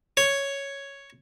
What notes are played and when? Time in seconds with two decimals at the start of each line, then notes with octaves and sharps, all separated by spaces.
0.17 C#5